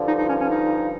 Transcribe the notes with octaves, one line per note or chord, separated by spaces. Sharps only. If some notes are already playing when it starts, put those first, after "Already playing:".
Already playing: G2 D3 F3
D#4
D#4
C#4
C#4
D#4